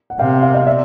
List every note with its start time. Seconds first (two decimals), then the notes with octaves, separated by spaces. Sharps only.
0.10 F#5
0.19 C3 F5 G5
0.43 F5 G5
0.54 D#5 F5
0.67 D5 E5